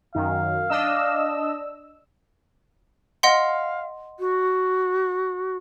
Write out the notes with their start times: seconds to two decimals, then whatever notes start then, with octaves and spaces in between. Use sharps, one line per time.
0.15 F#2 D#3 F5
0.70 D4 D#5 E6
3.23 D#5 F5 F#5 C6
4.19 F#4